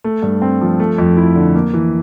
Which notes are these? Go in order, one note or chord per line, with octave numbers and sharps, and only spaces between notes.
A3
G2
C4
F3
A3
F2
E4
D3
A#3
E3